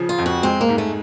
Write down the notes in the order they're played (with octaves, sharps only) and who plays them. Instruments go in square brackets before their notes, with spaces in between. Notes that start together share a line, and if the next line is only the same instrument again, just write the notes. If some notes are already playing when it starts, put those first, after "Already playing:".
Already playing: [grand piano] C#3 F3
[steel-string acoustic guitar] F4
[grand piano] F2
[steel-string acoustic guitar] F#4
[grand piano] G#3 [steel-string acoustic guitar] C4
[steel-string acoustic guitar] A#3
[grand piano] G#2
[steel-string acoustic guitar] A3